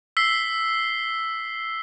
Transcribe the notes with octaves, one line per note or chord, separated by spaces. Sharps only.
E6 B6 C7 G7